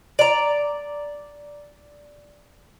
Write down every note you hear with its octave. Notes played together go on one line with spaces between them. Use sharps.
D5 A#5